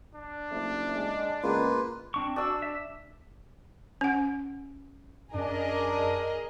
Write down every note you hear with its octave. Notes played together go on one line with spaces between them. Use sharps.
D4
F#1 F3 A3 E4
G#3
C#2 G#3 A#3 B3 F4 B4
C4 D4 C#6
D4 F#4 E6
E5
C#4 F#5
F#2 D4 G#4 A#4 D#5